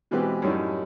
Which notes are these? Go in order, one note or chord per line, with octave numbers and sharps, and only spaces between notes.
B2 E3 G#3 C4 G4 B4
F#2 A2 G3 C#4 D#4